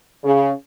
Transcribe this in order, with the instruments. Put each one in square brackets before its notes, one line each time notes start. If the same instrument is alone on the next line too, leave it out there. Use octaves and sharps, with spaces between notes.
[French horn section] C#3